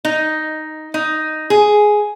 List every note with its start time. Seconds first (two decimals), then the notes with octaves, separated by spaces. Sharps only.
0.05 D#4
0.94 D#4
1.50 G#4